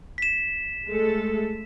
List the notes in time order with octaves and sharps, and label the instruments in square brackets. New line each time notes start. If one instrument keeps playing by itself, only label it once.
[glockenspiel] B6 E7
[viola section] G#3 A3 A4